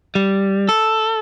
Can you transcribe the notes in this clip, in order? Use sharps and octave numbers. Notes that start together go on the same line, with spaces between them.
G3
A4